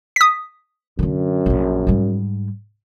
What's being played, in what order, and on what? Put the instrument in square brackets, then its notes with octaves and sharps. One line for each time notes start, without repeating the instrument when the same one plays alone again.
[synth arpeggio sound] D#6 B6
[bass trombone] F#2 [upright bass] D3 D4
[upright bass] A#1 A#2
G#2 G3